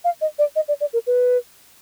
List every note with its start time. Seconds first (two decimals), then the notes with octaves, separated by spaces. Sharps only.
0.04 F5
0.21 D#5
0.39 D5
0.56 D#5
0.68 D5
0.81 D5
0.93 A#4
1.07 B4